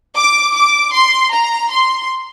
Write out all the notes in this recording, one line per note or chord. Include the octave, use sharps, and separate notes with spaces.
D6
D6
C6
A#5
C6